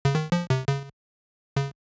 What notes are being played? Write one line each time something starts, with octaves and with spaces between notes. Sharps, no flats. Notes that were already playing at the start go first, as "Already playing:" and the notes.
C#3
D#3
F3
C3
C#3
C#3